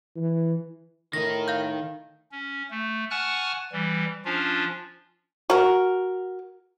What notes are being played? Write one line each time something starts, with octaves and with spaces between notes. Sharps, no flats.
E3
A2 D#3 D#4 A#4 A#6
F5 G6
C#4
A3
F#5 G#5 A5 C#6 F6 F#6
E3 G3
F3 C#4 D4 F4
F#4 A#4